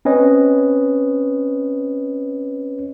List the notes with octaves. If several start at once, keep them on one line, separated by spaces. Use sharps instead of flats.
C4 C#4 B4 C#5 D#5